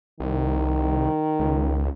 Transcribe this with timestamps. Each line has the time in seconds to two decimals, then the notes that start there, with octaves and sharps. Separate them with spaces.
0.20 C2 D#3
1.40 C#2